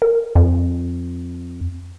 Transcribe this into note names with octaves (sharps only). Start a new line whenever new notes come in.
A#4
F2